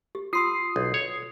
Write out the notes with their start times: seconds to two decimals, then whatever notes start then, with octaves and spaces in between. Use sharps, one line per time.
0.15 G4
0.33 F4 C6 D#6 E6 C7
0.76 B1
0.94 C#5